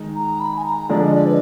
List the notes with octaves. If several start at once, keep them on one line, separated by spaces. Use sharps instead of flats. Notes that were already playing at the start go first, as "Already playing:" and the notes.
Already playing: D#3 G#3 D#4
A#5
B5
G#5
A#5
D3 F3 G#3 D4 D5
D#5
D5
B4